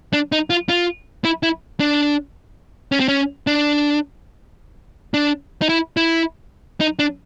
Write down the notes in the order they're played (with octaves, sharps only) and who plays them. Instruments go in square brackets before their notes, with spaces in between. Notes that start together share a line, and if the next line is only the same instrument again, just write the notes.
[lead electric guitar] D4
D#4
F4
F4
E4
E4
D4
C#4
C4
C#4
D4
D4
D#4
E4
E4
D#4
D4